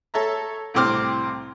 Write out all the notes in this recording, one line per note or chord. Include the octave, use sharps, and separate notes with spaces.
A4 C#5 E5 A#5
C2 A2 C3 C4 D6 F6